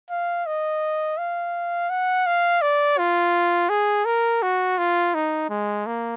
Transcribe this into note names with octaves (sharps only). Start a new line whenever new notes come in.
F5
D#5
F5
F#5
F5
D5
F4
G#4
A#4
F#4
F4
D#4
G#3
A#3